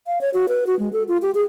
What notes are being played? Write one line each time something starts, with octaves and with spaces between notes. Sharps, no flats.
F5
C#5
F#4
B4
F#4
G#3
A4
F4
G4
G#4